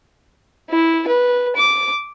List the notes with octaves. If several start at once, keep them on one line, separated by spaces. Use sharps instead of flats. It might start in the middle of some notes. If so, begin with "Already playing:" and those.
E4
B4
D6